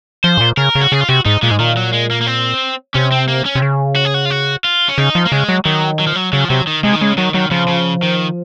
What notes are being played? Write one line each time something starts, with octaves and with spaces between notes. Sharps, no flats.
F3 C5
G#2
A#2
C#3 A#4
C#3
F#4
C#3 G#4
F4
C3 F#4
G#2 D#4
A#2 G#3
G#2
A#2 D#3
F#3
G#3
A#3
A#3
C4
C3 C#4
C4
A#3
C#4
C3
C#3
F#4
G#4
F#4
F4
F#4
F4
C#4
C#3 D#4
F3
A#3
C#3 G#3
F#3
D#3 F#3
F#3
F3
F#3
C#3 F#3
F3
C3 F#3
D#3
C3 G#3
D#3
C#3 G#3
D#3 F#3
D#3 F#3
C#3 F3
C#3
D#3